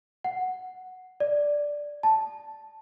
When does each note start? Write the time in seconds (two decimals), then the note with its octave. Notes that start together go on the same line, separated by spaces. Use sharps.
0.24 F#5
1.20 D5
2.03 A5